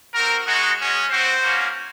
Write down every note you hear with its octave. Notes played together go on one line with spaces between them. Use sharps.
C4 F#4 A#4
G#3 D#4 F#4
G#3 C#4 F#4
C4 F#4 C5
A#3 C#4 F#4